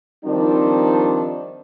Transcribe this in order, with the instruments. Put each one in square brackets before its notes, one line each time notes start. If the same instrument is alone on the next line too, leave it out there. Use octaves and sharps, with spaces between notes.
[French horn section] D#3 F3 G3 C4 D4 D#4